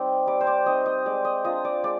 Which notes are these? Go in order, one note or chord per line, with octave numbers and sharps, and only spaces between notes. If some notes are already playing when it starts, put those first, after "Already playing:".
Already playing: G3 C4 D#4 D5
G3 D5
C5
D5
C4 D#4 D#5
D#5
G#3 D5
D#5
D4 F4 D#5
D5
G#3 D5